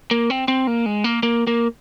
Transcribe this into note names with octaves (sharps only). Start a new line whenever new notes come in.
A#3
C4
C4
A#3
G#3
A#3
A#3
A#3